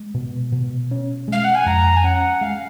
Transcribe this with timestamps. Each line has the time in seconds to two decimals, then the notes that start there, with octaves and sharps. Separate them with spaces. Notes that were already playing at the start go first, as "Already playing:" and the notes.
Already playing: G#3
0.14 B2
0.52 B2
0.91 C#4
1.28 G#3 F5
1.44 F#5
1.54 G#5
1.66 F2 A#5
1.96 G#5
2.04 C#4 F#5
2.41 G#3 F5